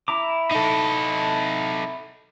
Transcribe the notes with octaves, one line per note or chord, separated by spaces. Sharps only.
E4 A#5 D6
D#4 A4